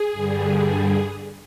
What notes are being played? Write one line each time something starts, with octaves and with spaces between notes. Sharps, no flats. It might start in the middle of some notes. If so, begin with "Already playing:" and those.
Already playing: G#4
G2 D3 G3